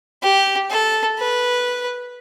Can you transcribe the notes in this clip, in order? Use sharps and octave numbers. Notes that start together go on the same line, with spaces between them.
G4
A4
B4